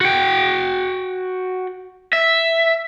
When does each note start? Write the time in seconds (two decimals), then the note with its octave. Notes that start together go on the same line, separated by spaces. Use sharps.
0.01 F#4 G5
2.13 E5